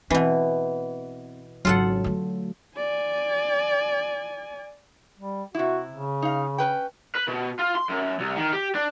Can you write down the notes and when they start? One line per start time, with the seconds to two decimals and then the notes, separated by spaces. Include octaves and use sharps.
0.10 B2 E3 C4
1.65 G#1 C#3 F#3 F4 A4 F#5
2.04 D3 A3
2.76 D5 G#5
5.19 G3
5.55 C3 E4 F#4
5.91 C#3
6.22 D#4 F5
6.58 C#4 B4 G5
7.15 B4
7.28 B2
7.59 F4
7.76 C6
7.90 F#2
8.20 C2
8.37 D#3
8.53 G4
8.75 D4